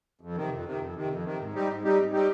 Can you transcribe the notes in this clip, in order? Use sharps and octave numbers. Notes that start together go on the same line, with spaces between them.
F2
C3 D#3
F2
C3 D#3
F2
C3 D#3
F2
C3 D#3
G#2
G3 C4 D#4 G4
G#2
G3 C4 D#4 G4
G#2
G3 C4 D#4 G4